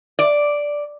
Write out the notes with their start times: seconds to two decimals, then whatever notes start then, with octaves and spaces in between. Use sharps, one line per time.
0.19 D5